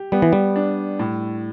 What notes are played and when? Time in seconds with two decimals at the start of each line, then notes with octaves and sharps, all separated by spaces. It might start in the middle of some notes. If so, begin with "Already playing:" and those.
Already playing: G4
0.12 G3 B3
0.22 E3
0.33 G3
0.56 D4
0.99 A2